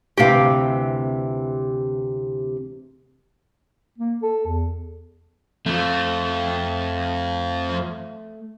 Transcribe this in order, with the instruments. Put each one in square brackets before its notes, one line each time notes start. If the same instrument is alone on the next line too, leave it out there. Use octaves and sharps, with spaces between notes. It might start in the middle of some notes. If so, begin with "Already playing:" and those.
[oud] D2 C3 E3 [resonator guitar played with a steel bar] G4 F5
[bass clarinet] A#3
A4
E2
[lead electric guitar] F2 F3 [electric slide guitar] A3